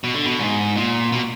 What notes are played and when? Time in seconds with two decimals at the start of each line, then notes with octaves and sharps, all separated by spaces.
0.04 B2
0.15 D3
0.26 B2
0.39 G#2
0.76 A#2
1.12 B2